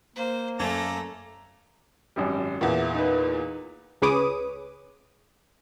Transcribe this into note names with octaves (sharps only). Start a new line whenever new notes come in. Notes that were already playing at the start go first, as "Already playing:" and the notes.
A#3 C5
F#2 A3 A4 D5 F5 A#5 G#6
G#1 F#2 G3
E2 A#2 E5 F#5
D#4 B4
C#2 G#4 B4 C#5 D6 D#6